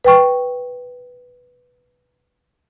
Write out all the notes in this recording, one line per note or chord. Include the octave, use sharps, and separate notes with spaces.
B4 G5 C#6